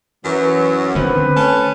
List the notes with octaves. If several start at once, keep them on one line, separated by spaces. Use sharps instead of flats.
F#2 E3 F#3
D3 D#3 B3 C4 B4
A3 C#4 A5